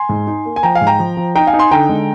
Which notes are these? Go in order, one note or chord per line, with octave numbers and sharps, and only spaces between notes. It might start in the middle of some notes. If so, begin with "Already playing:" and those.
Already playing: G#5 C6
G#2
D#4
A#3
G#5
F3 G5 A#5
F5 G#5
G#2
G5 A#5
F3
F3
D#4 G5 A#5
F5 G#5
D#4
G#5 C6
D3 G5 A#5
G#3